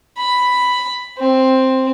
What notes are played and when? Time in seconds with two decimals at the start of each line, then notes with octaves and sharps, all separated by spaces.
0.18 B5
1.18 C4